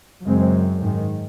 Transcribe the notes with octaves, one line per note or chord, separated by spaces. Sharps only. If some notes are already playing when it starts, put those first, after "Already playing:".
F#2 C#3 G#3 C4
G#2 D#3 G#3